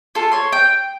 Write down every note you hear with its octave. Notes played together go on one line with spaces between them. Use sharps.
F4 A4
C#5 C6
G5